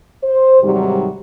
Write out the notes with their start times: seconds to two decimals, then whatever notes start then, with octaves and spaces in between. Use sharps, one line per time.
0.23 C5
0.62 G#2 C3 D#3 F#3 G3